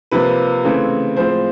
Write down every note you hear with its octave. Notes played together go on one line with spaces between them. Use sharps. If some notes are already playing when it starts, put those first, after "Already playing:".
C3 F3 A#3 B4
C#3 E3 A3 C4
A2 F3 G#3 C4 C5